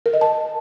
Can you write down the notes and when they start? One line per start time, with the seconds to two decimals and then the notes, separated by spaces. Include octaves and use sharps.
0.06 A#4
0.14 D#5
0.21 A5